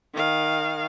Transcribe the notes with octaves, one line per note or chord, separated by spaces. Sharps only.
D#3 F5